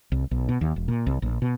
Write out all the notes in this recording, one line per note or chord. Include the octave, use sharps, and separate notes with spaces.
C2
B1
B2
D#2
E1
A#2
C2
A#1
B2